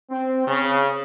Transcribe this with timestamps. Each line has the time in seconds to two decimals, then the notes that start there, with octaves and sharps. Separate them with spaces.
0.10 C4
0.47 C#3